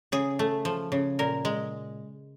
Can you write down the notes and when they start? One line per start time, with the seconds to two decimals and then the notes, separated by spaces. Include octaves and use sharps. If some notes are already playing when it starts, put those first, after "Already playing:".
0.12 C#3 G#4
0.39 A3
0.65 F3
0.92 C#3
1.19 A#2 A#4
1.45 G#3